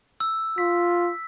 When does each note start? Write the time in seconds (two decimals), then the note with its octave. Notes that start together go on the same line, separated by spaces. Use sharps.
0.20 E6
0.58 F4 B6